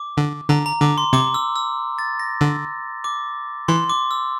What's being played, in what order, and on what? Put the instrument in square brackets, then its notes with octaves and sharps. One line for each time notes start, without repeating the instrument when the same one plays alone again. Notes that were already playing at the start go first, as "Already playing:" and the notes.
Already playing: [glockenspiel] D6
[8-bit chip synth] D3
[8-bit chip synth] D3 [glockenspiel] A#5
[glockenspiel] A#5
[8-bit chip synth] D3 [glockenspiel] D6
[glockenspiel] C6
[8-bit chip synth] C3 [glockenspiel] D6
[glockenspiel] E6
E6
A6
A#6
[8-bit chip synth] D3 [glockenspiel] E6
[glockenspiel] D6
[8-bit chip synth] E3 [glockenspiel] C6
[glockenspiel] D6
E6